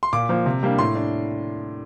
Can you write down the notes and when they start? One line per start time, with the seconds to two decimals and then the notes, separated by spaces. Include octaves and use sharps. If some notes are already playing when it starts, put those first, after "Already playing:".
0.03 C6
0.13 A#2 D6
0.29 F3 A#3
0.46 C3
0.63 G3 A#3 D4
0.79 A2 C6
0.95 D4